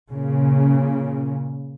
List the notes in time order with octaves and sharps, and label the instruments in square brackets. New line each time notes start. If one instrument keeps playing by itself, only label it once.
[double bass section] A#2 C#3